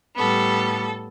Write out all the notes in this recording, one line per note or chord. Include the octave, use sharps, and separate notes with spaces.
A2 G3 B3 A4